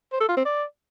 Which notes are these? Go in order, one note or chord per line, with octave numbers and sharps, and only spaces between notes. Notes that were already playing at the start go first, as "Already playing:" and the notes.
C5
A4
F4
C4
D5